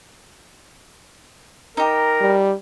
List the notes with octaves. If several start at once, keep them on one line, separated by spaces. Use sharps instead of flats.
D#4 G4 A#4
G3